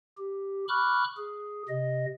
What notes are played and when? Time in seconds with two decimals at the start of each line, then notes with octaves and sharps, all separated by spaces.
0.18 G4
0.68 B5 C#6 D6 F6 F#6
1.17 G#4
1.69 C3 D#5